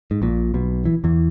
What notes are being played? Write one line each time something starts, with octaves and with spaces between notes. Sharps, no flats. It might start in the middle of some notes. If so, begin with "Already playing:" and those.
G#2
A#1 A#2
B1 B2
E3
E2 E3